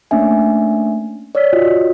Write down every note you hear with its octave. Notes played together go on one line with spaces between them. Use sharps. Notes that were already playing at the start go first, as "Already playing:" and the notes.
A3 A#3 C#4 D4 E5 G#5
C#5 D5 E6 F6 B6
F4 F#4 C#5 D#5